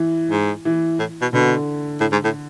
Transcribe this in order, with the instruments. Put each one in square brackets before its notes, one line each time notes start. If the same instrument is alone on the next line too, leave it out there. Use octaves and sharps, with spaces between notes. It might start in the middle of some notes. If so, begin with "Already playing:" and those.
Already playing: [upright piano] E3
[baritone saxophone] G#2
[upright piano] E3
[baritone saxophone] A2
B2
[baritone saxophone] B2 [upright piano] D3
[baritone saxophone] A2
G#2
A2